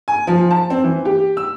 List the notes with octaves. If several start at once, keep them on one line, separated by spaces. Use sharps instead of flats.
G#5
F3
A5
C4
E3
G4
E6